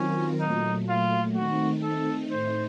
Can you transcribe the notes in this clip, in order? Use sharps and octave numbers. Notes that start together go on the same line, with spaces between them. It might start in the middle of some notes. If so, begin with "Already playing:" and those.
Already playing: D#3 F#3 C4 C#4 F4 A#4
A#2 F#3 A3 D#4
F4
D#3 A3 C4 D#4 F#4
A4
A2 A3 D#4 C5